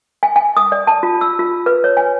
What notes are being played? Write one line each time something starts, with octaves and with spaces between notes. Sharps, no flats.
G#5
G#5
D#6
D5
A5
F4
E6
F4
B4
C#5
G#5